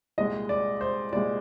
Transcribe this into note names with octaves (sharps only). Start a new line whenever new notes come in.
C2 A#2 G#3 D#5
D5
C5
C2 A#2 G#3 D5